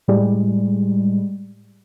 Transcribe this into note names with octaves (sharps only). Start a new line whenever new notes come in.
A2 G3 G#3